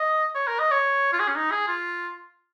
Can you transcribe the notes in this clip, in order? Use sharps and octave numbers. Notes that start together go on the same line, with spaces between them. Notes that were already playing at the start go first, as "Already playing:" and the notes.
Already playing: D#5
C#5
A#4
D#5
C#5
F4
G#4
C#4
D#4
G#4
F4